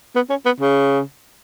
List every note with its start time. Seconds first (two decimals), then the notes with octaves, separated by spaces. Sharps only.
0.16 B3
0.30 C#4
0.46 B3
0.60 C#3